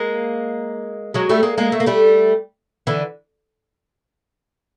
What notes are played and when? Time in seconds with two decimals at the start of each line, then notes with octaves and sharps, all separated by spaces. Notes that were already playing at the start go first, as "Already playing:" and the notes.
Already playing: G#3 A#3
1.14 F#3 G#3
1.29 G3 A3
1.43 G#3 A#3
1.58 G#3 A#3
1.72 A3
1.80 A#3
1.86 G3 A3
2.87 D3 E3